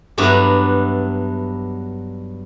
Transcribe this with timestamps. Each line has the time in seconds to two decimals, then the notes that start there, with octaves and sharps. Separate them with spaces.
0.18 G2 F#3 B3 D4 E4 A#5